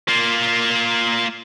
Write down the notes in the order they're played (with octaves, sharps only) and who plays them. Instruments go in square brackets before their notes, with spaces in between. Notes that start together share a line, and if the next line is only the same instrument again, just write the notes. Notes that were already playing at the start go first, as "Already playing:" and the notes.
[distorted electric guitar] A#3 F4